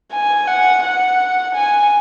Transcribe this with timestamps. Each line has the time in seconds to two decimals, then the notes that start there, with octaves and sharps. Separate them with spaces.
0.12 G#5
0.48 F#5
0.84 F#5
1.55 G#5